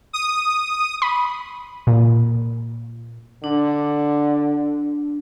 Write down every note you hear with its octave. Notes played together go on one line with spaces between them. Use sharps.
D#6
B5
A#2
D3 D4